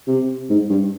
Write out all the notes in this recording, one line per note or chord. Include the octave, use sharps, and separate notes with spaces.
C3
G#2
G2